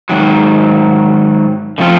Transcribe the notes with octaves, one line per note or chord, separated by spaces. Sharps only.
G#2 D#3 F#3
D3 F3 A3 C4 F4